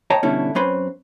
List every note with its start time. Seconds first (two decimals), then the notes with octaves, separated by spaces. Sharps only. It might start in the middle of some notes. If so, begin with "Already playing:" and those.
0.10 C#5 D#5 G5 A5 A#5
0.23 G2 B2 D3 C#4 E4 A4
0.55 F#2 C4 C#4 B4 C5 B5